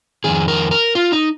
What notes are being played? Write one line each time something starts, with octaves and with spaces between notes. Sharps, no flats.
F2 D#3 G#4
A#4
A#4
F4
D#4